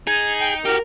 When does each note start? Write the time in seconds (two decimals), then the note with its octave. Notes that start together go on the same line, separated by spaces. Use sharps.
0.07 D#4 G#4 G#6
0.40 G5
0.65 F#4 G4 A#4 F6